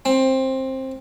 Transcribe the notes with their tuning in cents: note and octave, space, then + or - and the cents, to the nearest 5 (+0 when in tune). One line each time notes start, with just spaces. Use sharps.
C4 +15